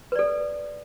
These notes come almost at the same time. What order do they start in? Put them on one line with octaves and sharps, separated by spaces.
B4 D5 A4